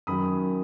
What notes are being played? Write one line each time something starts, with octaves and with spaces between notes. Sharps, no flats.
F#2 D#3 F#3 B5 D#6